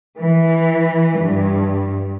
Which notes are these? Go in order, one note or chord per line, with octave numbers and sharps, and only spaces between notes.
E3
G2